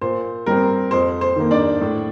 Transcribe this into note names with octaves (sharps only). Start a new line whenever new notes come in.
A#2 C5
G3 C4 A#4
F2 C5
C5
D#3 A#3
D4 D5
A2